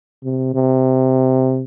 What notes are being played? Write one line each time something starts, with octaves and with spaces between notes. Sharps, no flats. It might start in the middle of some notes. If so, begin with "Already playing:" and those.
C3
C3